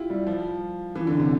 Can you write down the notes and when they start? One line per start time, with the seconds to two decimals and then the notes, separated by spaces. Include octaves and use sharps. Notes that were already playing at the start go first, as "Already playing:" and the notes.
Already playing: E4 F4 G4
0.10 G3
0.27 F3
0.95 E3
1.07 D3
1.19 C3